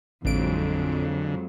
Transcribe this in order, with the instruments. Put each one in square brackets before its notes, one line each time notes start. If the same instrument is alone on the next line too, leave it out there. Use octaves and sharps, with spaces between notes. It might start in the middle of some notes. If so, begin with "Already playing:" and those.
[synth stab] A1 D7 [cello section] F2 F#3 G#3 [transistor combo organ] D3